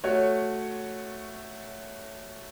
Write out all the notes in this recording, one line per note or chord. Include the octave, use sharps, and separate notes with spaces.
A3 F#4 C#5